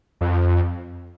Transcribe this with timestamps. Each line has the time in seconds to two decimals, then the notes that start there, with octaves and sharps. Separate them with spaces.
0.21 F2